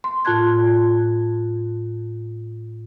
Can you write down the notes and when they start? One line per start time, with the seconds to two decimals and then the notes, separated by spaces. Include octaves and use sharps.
0.04 C6
0.25 A2 F4 A5 F#6 G#6